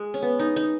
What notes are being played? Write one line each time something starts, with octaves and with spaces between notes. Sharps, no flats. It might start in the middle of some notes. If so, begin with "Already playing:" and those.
Already playing: G#3
C#4
B3
D#4
D#4